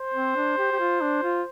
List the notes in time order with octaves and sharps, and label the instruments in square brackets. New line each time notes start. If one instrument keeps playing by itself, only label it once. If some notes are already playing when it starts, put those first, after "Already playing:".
Already playing: [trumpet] C5
[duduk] C4
D4
G4
G4
F4
D4
F4